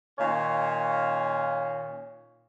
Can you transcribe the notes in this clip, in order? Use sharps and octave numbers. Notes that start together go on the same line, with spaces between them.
A#2 D#3 C#4 C#5 F5